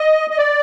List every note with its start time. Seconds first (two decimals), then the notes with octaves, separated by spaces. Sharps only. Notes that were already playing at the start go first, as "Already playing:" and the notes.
Already playing: D#5
0.30 D#5
0.38 D5